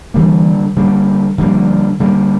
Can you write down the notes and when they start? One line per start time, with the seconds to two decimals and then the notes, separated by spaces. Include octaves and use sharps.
0.14 D3 E3 G3 A#3
0.76 D3 G3 A#3
1.38 D3 F3 G3 A#3
2.00 D3 G3 A#3